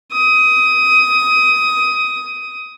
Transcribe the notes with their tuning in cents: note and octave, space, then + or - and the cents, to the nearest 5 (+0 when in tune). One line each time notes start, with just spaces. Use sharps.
D#6 +15